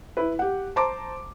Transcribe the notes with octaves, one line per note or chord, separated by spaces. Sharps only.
E4 B4
G4 F#5
C5 A5 A#5 C6 D6